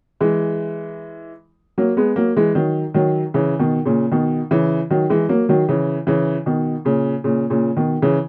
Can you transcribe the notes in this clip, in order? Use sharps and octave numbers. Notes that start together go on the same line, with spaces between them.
E3 G#3
F#3 A#3
G#3 B3
F#3 A#3
E3 G#3
D#3 F#3
D#3 F#3
C#3 E3
B2 D#3
A#2 C#3
B2 D#3
C#3 E3
D#3 F#3
E3 G#3
F#3 A#3
D#3 F#3
C#3 E3
C#3 E3
B2 D#3
A#2 C#3
A#2 C#3
A#2 C#3
B2 D#3
C#3 E3